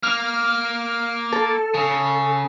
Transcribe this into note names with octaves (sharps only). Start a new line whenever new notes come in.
A#3 F6
A4
C#3